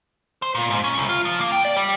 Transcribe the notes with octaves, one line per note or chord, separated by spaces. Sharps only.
C5
A#2
G#2
C#4
C2
F4
F3
A#3
G5
D5
G3